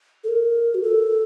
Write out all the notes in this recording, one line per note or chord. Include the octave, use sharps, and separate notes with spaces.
A4
A#4
F#4
A4